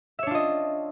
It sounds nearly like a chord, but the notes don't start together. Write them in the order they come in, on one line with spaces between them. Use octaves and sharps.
E5 C#5 D4 F4 D#5